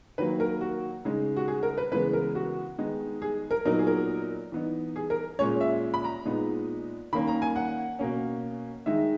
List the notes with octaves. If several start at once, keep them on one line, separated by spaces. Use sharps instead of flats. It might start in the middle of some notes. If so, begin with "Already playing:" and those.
D#3 F#3 A#3 B4
A#4
F#4
C#3 G#3 D#4
F#4
G#4
A#4
B4
C#3 E3 G#3 B3 B4
A#4
F#4
D#3 G#3 B3 D#4
G#4
A#4
A#2 F#3 B3 D#4 A#4
G#4
A#4
E3 B3 D#4
G#4
A#4
A#2 G#3 C#4 C#5
E5
B5
A#5
A#2 G#3 B3 D#4
D#3 A#3 C#4 B5
A#5
G#5
F#5
B2 A#3 C#4
D#3 G#3 D#4 E5